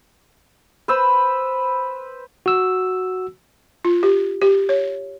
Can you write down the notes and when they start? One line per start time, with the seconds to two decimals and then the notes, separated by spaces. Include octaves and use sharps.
0.88 B4 C5 E6
2.46 F#4 E6
3.85 F4
4.03 G4
4.42 G4
4.69 C#5